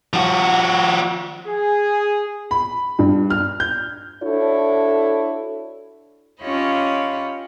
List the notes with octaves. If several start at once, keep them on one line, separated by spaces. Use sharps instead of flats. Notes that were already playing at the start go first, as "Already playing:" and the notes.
F3 F#4
G#4
B5
G2
F6
G6
D4 E4 F#4 A4 C#5
C#4 F4 G4 C#5 D#5 B5